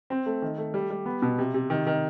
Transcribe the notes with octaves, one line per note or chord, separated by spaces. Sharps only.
C4
A3
D#3
A3
G3
G3
B3
B2
C3
C3
D#3
D#3